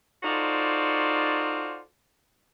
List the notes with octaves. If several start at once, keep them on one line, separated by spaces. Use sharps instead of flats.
D#4 F4 F#4 A4 C5 D5